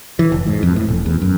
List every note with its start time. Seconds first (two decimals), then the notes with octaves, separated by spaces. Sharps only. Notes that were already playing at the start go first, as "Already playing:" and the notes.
0.19 E3
0.32 F1
0.47 G#2
0.63 F2
0.76 A2
0.88 E1
1.06 E2
1.22 F#2